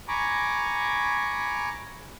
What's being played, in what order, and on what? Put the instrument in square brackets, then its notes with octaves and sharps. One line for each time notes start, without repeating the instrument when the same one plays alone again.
[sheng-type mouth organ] G#5 A#5 B5 C#6 D6